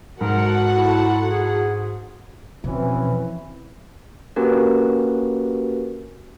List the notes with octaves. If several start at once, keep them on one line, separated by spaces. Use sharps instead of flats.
G#2 F#4 A4 A#4 F#5
E4
G#4
E2 B2 E3 F3 C4 C#4
A#3 C#4 F#4 G4 A#4 B4